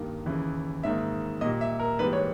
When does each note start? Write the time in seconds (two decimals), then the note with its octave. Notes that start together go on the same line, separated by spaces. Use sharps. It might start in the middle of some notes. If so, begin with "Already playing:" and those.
Already playing: G2 D#3 G3 A#3
0.26 D#2 C#3 E3
0.83 G#2 D#3 A#3 E5
1.41 A#2 G3 A#3 D#5
1.61 E5
1.79 A#4
1.99 G#2 E3 G3 A#3 B4
2.13 C#5